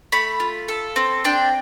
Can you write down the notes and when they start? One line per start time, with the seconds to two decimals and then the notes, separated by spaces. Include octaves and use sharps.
0.12 A3 B5
0.40 F4
0.68 A4
0.96 C4
1.25 D4 G5